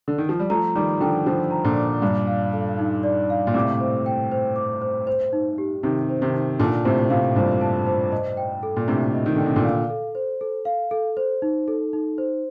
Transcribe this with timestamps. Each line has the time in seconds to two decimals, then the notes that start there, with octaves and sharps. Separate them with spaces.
0.08 D3
0.18 D#3
0.29 F3
0.39 G3
0.50 F3 A3 A#5
0.75 D#3 G3 D6
1.01 D3 F3 G5
1.26 D3 F3 C5
1.51 A#5
1.64 A#2 D3
1.76 D6
2.02 G2 A#2 D5
2.27 F5
2.53 A4
2.79 D#4
3.03 D5
3.30 F5
3.47 A#2
3.54 A2 C3 D6
3.80 C5
4.06 G5
4.32 C5
4.56 D6
4.82 C5
5.07 C5
5.33 D#4
5.58 G4
5.83 C3 D#3 D#4
6.09 C5
6.21 C3 D#3
6.34 D#4
6.59 A#2 D3 A5
6.85 A2 C3 C5
7.10 A2 C3 F5
7.36 G2 A#2 C5
7.61 A5
7.86 C5
8.12 D#5
8.37 G5
8.63 A4
8.77 A#2
8.88 A2 C3 D4
9.14 D#5
9.26 D#3
9.36 D3 G5
9.46 C3
9.56 A#2 D3
9.64 F5
9.90 A4
10.15 C5
10.41 A4
10.65 F5
10.91 A4
11.17 C5
11.42 D#4
11.68 A4
11.93 D#4
12.18 C5